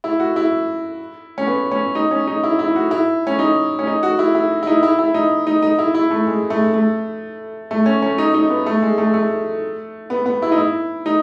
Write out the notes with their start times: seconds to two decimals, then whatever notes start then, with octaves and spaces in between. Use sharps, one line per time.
0.04 E4
0.20 F#4
0.36 E4
1.38 C#4
1.47 B3
1.71 C#4
1.95 D#4
2.11 C#4
2.27 D#4
2.44 E4
2.59 E4
2.76 F#4
2.91 E4
3.27 C#4
3.39 D#4
3.79 C#4
3.87 D#4
4.03 F#4
4.19 E4
4.35 E4
4.63 E4
4.67 D#4
4.83 E4
4.99 E4
5.14 D#4
5.47 D#4
5.62 D#4
5.79 E4
5.94 E4
6.11 A3
6.27 G#3
6.50 A3
6.74 A3
7.71 A3
7.86 C#4
8.02 C#4
8.18 D#4
8.34 D#4
8.50 B3
8.66 A3
8.82 G#3
8.98 A3
9.14 A3
10.10 B3
10.26 B3
10.42 E4
10.52 D#4
10.58 E4
11.06 D#4